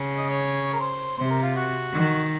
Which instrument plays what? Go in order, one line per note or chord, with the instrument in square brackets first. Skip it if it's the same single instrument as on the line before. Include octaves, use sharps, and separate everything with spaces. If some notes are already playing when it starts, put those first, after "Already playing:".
Already playing: [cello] C#3
[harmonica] D#5
C#5
A#4
C5
[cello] C3 [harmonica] C5
[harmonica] A#4
F4
F#4
[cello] D#3